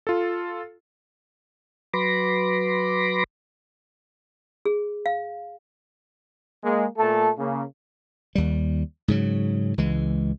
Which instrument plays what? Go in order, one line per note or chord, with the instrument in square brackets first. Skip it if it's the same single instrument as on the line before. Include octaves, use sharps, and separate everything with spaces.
[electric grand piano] F4 A4
[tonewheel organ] F#3 B4 B5 C6 D6 A#6
[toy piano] G#4
F5
[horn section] G#3 A#3
A#2 A3 A4 A5
C#3 A#3
[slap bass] D#2 G3
G#2 C#3 F#3
C#2 E3 G#3